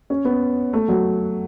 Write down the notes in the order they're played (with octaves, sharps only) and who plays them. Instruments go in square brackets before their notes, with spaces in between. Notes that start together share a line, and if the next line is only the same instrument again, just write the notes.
[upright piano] C#4
B3
A3
F#3